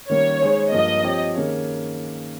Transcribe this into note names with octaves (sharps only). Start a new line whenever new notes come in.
D#3 G3 A#3 C#4 C#5
G#3 D#4 G#4 C5
G2 F3 A#3 D#5
F3 C4 G4 C#5
D#3 A#3 C#4 G#4 C#5